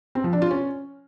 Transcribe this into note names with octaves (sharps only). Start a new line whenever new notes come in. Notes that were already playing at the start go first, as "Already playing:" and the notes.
C4
F3
D4
F4
C#4